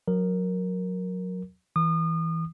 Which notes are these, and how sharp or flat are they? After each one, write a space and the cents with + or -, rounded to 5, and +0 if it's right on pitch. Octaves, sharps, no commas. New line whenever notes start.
F#3 -25 A#4 +0
E3 -15 D#6 -35